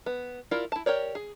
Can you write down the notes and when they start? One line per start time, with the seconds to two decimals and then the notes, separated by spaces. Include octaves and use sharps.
0.06 B3
0.51 E4 F4 A#4 D5
0.72 E4 A5
0.86 G4 A#4 C#5 D5
1.15 G#4